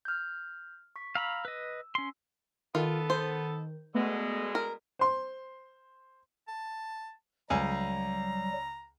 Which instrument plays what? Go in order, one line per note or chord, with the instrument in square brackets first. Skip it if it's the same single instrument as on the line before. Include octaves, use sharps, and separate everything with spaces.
[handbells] F6 G6
C#6 B6
[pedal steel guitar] F5 A#5 B5 [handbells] E6
[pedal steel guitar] B4 D#5
C#4 C6
[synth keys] D#3 [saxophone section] B3 A4 [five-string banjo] F4
[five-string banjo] C5
[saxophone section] B2 D3 G#3 [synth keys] A3 B3
[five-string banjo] A#4
[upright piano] C5 C6
[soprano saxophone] A5
[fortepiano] C#2 G#5 [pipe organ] F#3 G3 [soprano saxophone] A#5